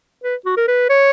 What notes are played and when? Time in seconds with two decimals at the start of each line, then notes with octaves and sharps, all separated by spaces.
0.24 B4
0.46 F#4
0.57 A#4
0.68 B4
0.89 C#5